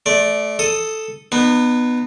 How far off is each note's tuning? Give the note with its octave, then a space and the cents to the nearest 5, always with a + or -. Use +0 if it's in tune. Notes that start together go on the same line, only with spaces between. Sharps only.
A3 -25 D5 +0
A4 +0 D#6 +0
B3 +0 D#4 -35